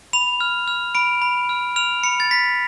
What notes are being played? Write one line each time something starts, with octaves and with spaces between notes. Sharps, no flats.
B5 F7
F6
F6
B5 D7
B5
F6
F6 F7
B5 C#7
A6
B5 B6